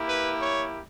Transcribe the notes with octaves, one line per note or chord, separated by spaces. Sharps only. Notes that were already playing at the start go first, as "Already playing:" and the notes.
Already playing: A#3 E4 G4
B4
C#5